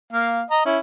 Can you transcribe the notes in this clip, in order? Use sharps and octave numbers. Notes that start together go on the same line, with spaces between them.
A#3 F5
D#5 A#5
C#4 E4